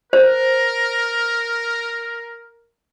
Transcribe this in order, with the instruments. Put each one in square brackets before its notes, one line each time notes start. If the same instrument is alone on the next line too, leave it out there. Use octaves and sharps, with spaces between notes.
[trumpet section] A#4 [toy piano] C5